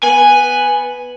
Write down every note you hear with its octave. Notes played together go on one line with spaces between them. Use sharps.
B3 G#5